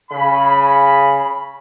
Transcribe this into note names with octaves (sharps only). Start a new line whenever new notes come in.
C#3 B5